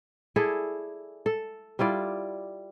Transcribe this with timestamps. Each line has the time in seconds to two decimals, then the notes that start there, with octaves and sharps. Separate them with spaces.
0.36 E4 G#4 A4 D5
1.26 A4
1.79 G3 E4 F4 D5